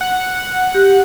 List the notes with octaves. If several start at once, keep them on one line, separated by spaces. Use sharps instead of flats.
F#5
G4